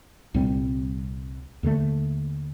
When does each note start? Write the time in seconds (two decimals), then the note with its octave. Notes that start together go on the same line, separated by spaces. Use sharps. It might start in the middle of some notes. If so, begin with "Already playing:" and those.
0.34 C2 A#2 G3 C4
1.63 D#2 D3 F#3 A3